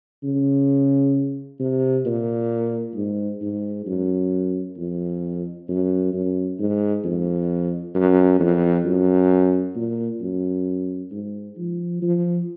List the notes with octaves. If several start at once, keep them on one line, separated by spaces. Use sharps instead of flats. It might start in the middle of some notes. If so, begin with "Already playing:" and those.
C#3
C3
A#2
G#2
G#2
F#2
F2
F#2
F#2
G#2
F2
F#2
F2
F#2
A#2
F#2
G#2
F3
F3